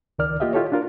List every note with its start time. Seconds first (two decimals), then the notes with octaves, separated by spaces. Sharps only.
0.19 C#2 D#3 A#4 D5 F6
0.40 A#3 F4 G4 D#5 E5
0.53 E4 F4 G4 A4 C#5
0.72 D4 F4 A#4